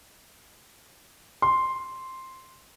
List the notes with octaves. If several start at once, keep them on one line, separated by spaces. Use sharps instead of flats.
C6